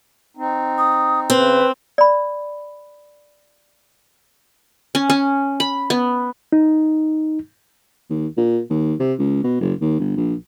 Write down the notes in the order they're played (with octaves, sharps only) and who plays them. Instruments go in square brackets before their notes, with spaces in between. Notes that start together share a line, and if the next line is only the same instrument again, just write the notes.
[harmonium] C4 D#4
[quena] D#6
[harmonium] C#3 [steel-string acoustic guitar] C4 [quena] B4
[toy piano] D5 B5
[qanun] C#4
C#4
B5
B3
[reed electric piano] D#4
[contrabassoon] D#2
A#2
D#2
C3
C#2
B2
F#1
D#2
G1
A#1